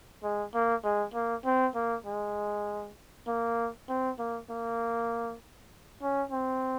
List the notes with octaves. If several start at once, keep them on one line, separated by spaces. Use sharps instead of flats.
G#3
A#3
G#3
A#3
C4
A#3
G#3
A#3
C4
A#3
A#3
C#4
C4